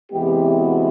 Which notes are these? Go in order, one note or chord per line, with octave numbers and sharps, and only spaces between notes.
E2 C3 E3 G#3 B3 G4
F#4